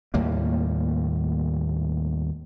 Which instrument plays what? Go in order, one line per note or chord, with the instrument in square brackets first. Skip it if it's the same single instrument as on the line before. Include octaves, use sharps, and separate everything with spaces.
[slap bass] D#2 A2 G3 A#3